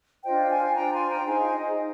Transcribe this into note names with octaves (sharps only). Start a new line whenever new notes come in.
D4 F4 C5 D#5 G5
F5 G#5
D4 F4 C5 G5 A#5
G#5 C6
G5 A#5
D#4 G#4 C5 F5 G#5
D#5
D#4